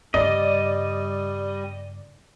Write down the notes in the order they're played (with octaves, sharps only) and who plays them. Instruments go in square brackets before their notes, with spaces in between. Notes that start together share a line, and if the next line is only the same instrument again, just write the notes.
[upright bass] G2 C#3 [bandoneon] G3 [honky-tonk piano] D5 [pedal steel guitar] D#5